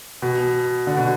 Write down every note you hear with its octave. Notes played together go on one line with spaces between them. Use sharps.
B2
D3
B2